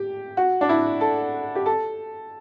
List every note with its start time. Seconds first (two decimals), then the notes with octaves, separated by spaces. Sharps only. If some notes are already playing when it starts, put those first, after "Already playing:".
Already playing: G4
0.37 F#4
0.61 D4
0.69 E4
1.01 A4
1.55 G4
1.66 A4